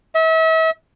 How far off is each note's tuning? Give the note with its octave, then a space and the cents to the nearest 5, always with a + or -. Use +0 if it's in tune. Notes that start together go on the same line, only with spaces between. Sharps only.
E5 -40